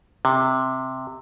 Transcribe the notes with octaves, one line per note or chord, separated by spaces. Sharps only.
C3